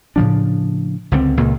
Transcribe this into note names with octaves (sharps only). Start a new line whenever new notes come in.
A2 C#3 F3 D4
C#2 D3 G3 C4
C#2 A#2 C#3 A#3